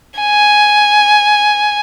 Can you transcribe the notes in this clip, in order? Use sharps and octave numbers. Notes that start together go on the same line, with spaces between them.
G#5